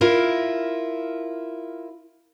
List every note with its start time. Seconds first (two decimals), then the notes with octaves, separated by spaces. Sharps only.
0.01 E4 F4 A#4